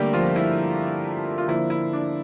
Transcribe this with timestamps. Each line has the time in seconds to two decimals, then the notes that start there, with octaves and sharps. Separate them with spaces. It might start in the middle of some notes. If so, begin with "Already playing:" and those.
Already playing: D3 G3 A3 A#3 G4 A#4
0.13 F3 F4
0.36 E4
1.38 F4
1.48 D3 F3 A#3 E4
1.70 E4
1.93 D4